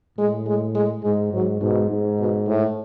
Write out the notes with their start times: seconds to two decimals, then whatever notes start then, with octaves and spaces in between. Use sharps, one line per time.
0.18 A2 G#3
0.46 G#3
0.75 G#3
1.03 G#2 G#3
1.32 G#2 F#3
1.61 G#2 B2
1.89 G#2
2.19 B2
2.48 A2